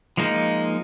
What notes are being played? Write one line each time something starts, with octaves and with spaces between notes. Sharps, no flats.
F3 G#3 A#3 D#4